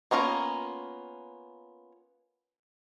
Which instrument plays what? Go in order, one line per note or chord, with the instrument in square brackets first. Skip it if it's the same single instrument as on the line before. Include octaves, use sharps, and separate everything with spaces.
[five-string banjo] A#3 B3 C#4 F4 A#4